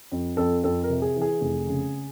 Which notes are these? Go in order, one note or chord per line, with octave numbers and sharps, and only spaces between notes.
F2
F2 A4
F2 A4
A#4
C3
G#4
E3
G#4
F1
C#3